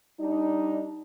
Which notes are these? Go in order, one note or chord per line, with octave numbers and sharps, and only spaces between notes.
G3 D4 D#4